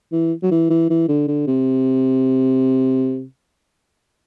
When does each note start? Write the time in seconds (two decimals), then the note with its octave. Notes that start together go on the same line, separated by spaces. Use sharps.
0.12 E3
0.43 F#3
0.51 E3
0.70 E3
0.90 E3
1.08 D3
1.28 D3
1.47 C3